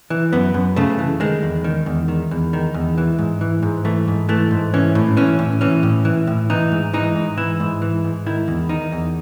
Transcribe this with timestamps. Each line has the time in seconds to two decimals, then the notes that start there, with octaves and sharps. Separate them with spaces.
0.10 E3
0.33 F#2 B3
0.54 F#2
0.76 C#3 A3
0.99 E3
1.20 D#3 G#3
1.43 E2
1.64 D#3
1.86 E2
2.08 D#3
2.31 E2
2.53 D#3
2.74 E2
2.98 E3
3.19 G#2
3.41 E3
3.63 G#2
3.85 E3 A3
4.08 G#2
4.29 E3 A3
4.51 G#2
4.74 E3 C#4
4.95 A2
5.17 E3 C#4
5.39 A2
5.61 E3 C#4
5.83 A2
6.05 E3
6.27 A2
6.50 E3 D#4
6.72 G#2
6.93 E3 D#4
7.15 G#2
7.38 E3 E4
7.60 G#2
7.82 E3
8.04 G#2
8.26 D#3 E4
8.48 E2
8.69 D#3 D#4
8.92 E2